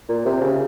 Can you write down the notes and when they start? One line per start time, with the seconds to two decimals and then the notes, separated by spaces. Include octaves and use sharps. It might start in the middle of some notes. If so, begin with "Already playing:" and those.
0.09 A#2
0.25 C3
0.41 C#3